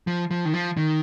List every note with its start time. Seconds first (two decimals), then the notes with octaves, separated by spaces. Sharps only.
0.07 F3
0.31 F3
0.45 D#3
0.54 F3
0.77 D#3